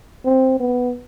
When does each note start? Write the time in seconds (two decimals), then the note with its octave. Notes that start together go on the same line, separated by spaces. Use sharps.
0.25 C4
0.60 B3